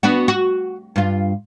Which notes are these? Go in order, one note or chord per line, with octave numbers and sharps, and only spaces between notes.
B3 D4 F#4
F#4
G2 F4